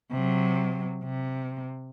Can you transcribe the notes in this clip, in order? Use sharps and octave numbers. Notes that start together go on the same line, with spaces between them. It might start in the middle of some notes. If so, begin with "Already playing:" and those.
C3 F#3
C3